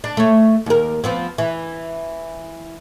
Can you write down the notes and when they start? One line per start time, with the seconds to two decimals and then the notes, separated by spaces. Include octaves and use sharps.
0.04 D4
0.17 A3 C#5
0.66 D#2 A#4
1.04 F3 B3 C4
1.38 E3